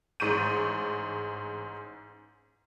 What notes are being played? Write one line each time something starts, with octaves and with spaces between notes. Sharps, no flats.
A1 G#2 C#6 G6 D#7